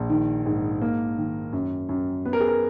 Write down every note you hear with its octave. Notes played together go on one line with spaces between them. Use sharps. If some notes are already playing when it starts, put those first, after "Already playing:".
Already playing: A#1
D#3
G#2
A#3
D#3
F#2
F#2
B3 B4
A#4
G#4
A#4